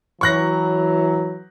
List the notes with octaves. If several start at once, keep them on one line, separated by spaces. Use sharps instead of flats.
E3 F#3 C#6 F#6 A#6